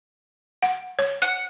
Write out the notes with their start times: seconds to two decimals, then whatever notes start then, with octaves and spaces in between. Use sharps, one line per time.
0.62 F#5
0.99 C#5
1.22 F#5